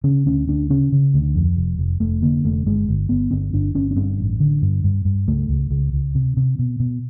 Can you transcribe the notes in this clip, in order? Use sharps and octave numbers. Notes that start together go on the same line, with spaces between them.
C#3 C#4
D2 C#4
D2 D4
C#3 C#4
C#3
D2
F2
F1
F1
F1 A3
D3 A#3
F1 A3
G1 G#3
G1
G1 B3
G1 C4
G1 D4
G1 C#4
C#4
G2 C4
A1
D3
G2
G2
G2
C#2 A3
C#2
C#2
C#2
C3
C3
B2
B2